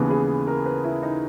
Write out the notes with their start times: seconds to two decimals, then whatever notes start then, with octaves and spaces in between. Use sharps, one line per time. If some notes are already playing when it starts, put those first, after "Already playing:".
Already playing: D#2 C#3 E3 B3
0.10 G#4
0.47 A#4
0.66 B4
0.84 E4
1.03 D#4